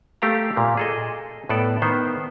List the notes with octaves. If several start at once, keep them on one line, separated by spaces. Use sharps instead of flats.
A3 G4 F5 A#5
A#2 A#3
G#4 A4 D#5
A2 B3 A4 D5
D#3 B3 C5